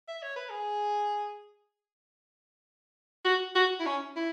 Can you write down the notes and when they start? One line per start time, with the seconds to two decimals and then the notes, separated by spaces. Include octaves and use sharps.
0.08 E5
0.22 C#5
0.36 B4
0.50 G#4
3.25 F#4
3.55 F#4
3.80 E4
3.86 C#4
4.16 E4